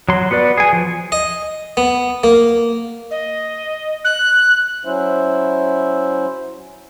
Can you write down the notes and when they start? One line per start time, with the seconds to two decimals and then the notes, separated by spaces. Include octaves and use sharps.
0.09 F#3 C6
0.31 B3 F#4 B4 D5
0.58 G#4 G#5
0.73 F3
1.12 D#5
1.77 B3
2.24 A#3
3.11 D#5
4.05 F#6
4.85 F#3 C#4 E4 C5 E5